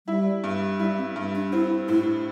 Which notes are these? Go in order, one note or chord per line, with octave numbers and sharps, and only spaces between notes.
G3 E4
G2
G3 E4
C4
G2
D4
C4 E4
A2 E4